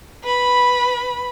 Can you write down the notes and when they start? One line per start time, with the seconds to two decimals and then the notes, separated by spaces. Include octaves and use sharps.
0.23 B4 B5